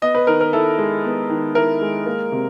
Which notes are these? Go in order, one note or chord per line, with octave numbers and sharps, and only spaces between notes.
B3 D#5
B4
D#3 A#4
A#4
E4 A4
G#3
B3
D#3
E4 A#4
G#3
A#3
C3